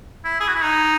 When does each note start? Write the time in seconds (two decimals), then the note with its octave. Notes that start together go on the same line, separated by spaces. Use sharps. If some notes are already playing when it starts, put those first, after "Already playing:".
0.24 E4
0.40 G#4
0.48 F#4
0.55 E4
0.64 D#4